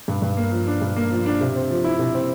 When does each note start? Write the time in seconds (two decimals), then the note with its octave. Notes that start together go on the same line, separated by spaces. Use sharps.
0.08 G2
0.22 G2
0.37 A#3
0.52 F3
0.67 D4
0.82 G2
0.96 A#3
1.11 F3
1.26 D4
1.41 C3
1.56 C4
1.71 F3
1.84 E4
1.99 C3
2.15 C4